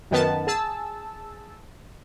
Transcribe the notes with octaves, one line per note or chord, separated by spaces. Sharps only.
F#2 D#3 B3 A5
G#4 A5 E6